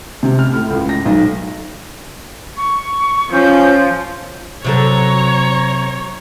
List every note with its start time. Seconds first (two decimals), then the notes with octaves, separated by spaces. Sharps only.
0.23 C3
0.39 F6
0.53 A2
0.70 C#2
0.89 A#6
1.05 B1
2.57 C#6
3.33 F3 C#4 G6
4.64 C3 F#3 A4 C5 C#5 A#5